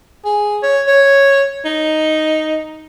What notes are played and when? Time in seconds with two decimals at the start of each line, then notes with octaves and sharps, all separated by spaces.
0.25 G#4
0.63 C#5
0.87 C#5
1.65 D#4